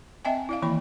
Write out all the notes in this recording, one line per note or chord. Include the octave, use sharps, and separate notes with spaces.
C4 D#5 E5 G5 G#5
E4 D5 F5
D#3 E3 A#3 E4 B5